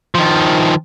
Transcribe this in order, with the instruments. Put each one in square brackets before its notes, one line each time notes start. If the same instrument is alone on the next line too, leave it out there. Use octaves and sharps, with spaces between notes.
[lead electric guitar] D#3 F3